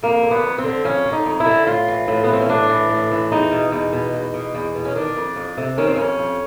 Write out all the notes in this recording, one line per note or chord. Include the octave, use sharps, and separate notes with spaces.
F2 A#3
D3
B3
F2
C4
D3
F2 C#4
D3
D#4
F2
E4
D3
A2 F4
E3
A2
B3
E3 C4
C#4
A2 D4
E3
A2
E3
E2 D#4
B2
E2
B2
E2
B2
E2
B2
C#4
D#3 D4
F2
F2
C3
D#3 C#4
C4
F2 C#4
F2